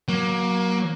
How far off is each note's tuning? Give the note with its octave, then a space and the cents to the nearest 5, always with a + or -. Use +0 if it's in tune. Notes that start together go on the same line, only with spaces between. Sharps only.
F#3 +0 A#3 +20